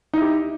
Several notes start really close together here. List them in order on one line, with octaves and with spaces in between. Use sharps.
D#4 E4 G4